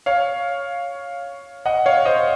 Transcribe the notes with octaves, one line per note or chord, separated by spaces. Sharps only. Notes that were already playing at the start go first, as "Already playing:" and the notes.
C#5 F5
D#5 F#5
C#5 F5
C5 D#5